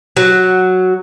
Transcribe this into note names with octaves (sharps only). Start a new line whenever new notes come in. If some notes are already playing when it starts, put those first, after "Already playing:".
F#3